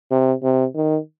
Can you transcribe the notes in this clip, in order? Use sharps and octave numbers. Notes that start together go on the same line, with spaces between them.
C3
C3
D#3